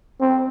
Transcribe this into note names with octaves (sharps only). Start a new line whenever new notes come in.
C4